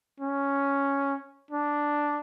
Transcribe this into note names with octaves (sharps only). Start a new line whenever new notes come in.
C#4
D4